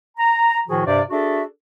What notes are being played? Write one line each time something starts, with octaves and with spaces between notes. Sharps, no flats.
A#5
A2 D#3 F3 F#4 G#4
G2 C3 C5 D5
D4 F#4 G#4 A4 E5